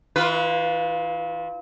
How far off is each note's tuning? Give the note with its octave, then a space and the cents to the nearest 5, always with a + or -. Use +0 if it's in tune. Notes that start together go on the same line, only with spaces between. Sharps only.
E3 -40 F4 +0 B4 +0